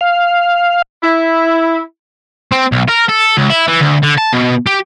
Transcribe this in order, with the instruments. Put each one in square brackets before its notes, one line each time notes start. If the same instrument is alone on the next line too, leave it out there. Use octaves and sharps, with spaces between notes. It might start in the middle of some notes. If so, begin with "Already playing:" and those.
[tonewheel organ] F5
[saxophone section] E4
[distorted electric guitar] C4
B1
A#4
A4
C#2
E4
E3
D2
D3
A5
B2
G4